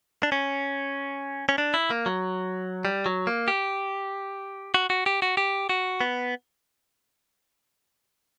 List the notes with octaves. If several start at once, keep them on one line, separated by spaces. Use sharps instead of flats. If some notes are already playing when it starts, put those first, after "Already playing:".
D4
C#4
C#4
D4
E4
A#3
F#3
G3
F#3
A#3
G4
F#4
F#4
G4
F#4
G4
F#4
B3